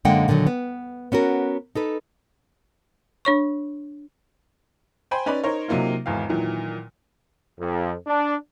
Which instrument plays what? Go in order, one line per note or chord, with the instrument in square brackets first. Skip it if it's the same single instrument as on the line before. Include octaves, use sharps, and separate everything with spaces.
[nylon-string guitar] F#2 D3 G#3 A#3 F#5 G5
A#2 D3 D#3 F3 F#3
B3
B3 C#4 F#4 A#4
D#4 A4 B4
[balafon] D4 C#5 C#6
[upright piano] C5 G5 G#5 B5 C6
C#4 D#4 B4 D5 B5
D#4 A#4 C5 C#5
C3 F#3 A#3 D#4 F4
G#1 E2 F5
A#2 D#3 E3 F#3
[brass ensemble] F2
D4